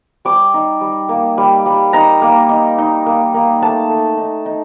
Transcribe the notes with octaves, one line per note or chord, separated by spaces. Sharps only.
G3 D6
D#4
G3
A#3
G3
G3
D#4 A#5
A#3
D#4
D#4
A#3
A#3
A3 A5
A3
D#4
D#4